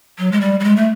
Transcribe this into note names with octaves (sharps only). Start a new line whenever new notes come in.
F#3
G#3
G3
G3
G#3
A3